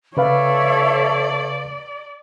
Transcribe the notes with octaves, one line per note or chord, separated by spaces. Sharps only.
C#3 A4 B4 C#5 D5 E5 F5